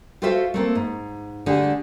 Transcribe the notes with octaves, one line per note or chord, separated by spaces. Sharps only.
F4 F#4 A4 C5 E5 F5
A3 A#3 C4
G#2
D3 A3 G4 G#4